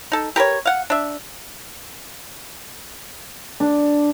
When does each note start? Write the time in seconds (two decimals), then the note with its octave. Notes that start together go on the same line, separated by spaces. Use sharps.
0.12 D#4 A4
0.36 G4 A#4 B4 C#5
0.65 F5 F#5
0.90 D4 E5
3.60 D4